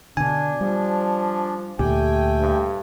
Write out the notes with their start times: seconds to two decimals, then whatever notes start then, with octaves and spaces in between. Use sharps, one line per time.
0.17 B2 D3 D4 G#5
0.61 F3 G3
1.79 D2 A#2 A3 G4 G5 G#5
2.40 G2